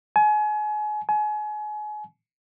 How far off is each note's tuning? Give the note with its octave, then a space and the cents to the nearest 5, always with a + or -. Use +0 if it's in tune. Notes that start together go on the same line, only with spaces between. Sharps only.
G#5 +30
G#5 +30